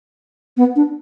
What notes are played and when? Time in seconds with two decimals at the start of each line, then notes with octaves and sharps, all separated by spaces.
0.57 B3
0.76 D4